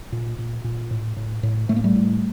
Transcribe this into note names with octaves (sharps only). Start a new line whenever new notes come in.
A#2
A#2
A#2
A2
A2
A2
A2 A3
A#3
G3 A3
A2